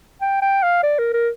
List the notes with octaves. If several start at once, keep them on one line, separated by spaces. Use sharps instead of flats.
G5
G5
F5
D5
A#4
A#4